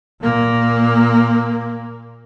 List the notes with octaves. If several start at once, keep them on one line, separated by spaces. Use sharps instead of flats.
A#2 A#3